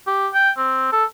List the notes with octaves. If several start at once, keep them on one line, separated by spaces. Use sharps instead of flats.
G4
G5
C4
A4